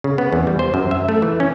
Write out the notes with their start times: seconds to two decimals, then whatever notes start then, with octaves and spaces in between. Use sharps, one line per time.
0.04 C#3
0.18 B3
0.33 E2
0.47 G3
0.59 C5
0.74 F#2
0.91 E5
1.09 A3
1.22 E3
1.40 C#4